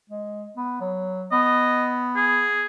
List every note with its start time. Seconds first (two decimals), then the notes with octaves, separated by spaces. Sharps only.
0.10 G#3
0.57 B3
0.81 F#3
1.32 B3 D#5
2.16 G#4